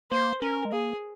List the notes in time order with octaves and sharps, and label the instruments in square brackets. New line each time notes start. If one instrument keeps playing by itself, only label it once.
[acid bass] A#3 [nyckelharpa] C5
[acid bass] C#4 [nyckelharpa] A#4
[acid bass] G#3
[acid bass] A#3 [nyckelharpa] G#4